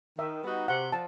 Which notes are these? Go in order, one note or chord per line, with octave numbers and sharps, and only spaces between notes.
D#3 E5
G3 B3 D#4 F#4
C3 F#5
F3 A5